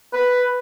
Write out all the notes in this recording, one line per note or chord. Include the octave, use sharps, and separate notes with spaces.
B4